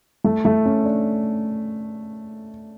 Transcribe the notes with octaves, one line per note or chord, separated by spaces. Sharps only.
A3
A3
C#4
D4